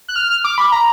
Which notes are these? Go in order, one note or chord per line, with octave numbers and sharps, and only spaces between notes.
F#6
F6
F6
D6
B5
A#5